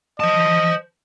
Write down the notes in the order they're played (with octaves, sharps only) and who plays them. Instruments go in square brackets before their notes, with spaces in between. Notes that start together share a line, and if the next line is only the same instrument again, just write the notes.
[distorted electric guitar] C5 A5 [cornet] D#5